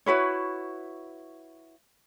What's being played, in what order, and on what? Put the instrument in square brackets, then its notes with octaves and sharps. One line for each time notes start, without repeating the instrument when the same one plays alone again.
[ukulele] E4 F#4 B4 C#5